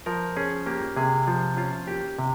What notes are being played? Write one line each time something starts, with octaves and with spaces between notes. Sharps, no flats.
F3 A#4
C#4 G#4
A#3 G4
C3 G#4
F3 F4
C#4 F4
A#3 G4
C3